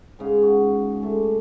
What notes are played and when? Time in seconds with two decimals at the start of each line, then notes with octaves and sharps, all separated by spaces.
0.19 G#2 C#3 F5
0.42 F#4
1.01 G#3 A3 D4